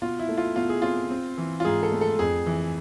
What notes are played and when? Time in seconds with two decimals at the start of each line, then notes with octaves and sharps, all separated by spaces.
0.02 B2 F4
0.19 E4
0.29 A3
0.37 F4
0.56 B2 F4
0.69 G#4
0.82 C4 F4
1.10 C4
1.38 E3
1.60 F4
1.65 G#2 G#4
1.83 A4
1.92 A3
2.01 A4
2.19 F2 G#4
2.46 E3